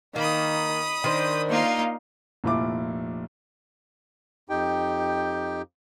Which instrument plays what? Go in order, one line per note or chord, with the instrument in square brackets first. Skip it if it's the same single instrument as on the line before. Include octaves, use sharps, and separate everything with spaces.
[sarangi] D#3 [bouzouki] A#3 [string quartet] B5 D#6
[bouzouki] D#3 C5 [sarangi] D4
[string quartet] A#3 D#4 F4
[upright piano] F1 A#2 F3 E4 F4 D6
[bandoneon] F2 D#4 G4 G5